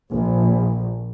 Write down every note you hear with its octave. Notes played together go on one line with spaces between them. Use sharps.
A#1